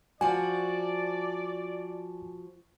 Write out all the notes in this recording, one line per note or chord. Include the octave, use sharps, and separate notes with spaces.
F3 F#4 D5 G#5